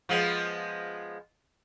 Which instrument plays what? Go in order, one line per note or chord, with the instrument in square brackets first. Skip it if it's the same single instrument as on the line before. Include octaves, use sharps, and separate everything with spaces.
[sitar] F3 G#3 B3